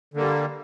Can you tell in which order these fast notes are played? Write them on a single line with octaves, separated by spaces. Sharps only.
D3 A#3 G3